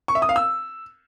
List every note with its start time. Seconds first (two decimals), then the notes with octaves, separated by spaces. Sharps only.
0.08 C#6
0.15 E5
0.22 D#6
0.29 F5
0.36 E6